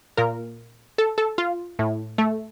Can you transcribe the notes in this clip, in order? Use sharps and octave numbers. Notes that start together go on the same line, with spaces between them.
A#2 A#4
A4
A4
F4
A2
A3